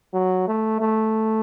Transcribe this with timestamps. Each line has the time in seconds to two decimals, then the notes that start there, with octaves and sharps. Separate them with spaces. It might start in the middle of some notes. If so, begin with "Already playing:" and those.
0.14 F#3
0.48 A3
0.81 A3